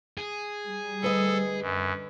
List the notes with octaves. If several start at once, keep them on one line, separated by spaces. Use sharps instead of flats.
G#4
G3
D2 A4 B4 D#5
F#2